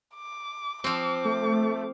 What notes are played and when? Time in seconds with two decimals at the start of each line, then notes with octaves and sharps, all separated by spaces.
0.15 D6
0.84 F3 C4 D6
1.25 A3